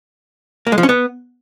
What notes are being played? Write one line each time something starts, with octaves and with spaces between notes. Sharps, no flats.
A#3
G#3
F3
C#4
B3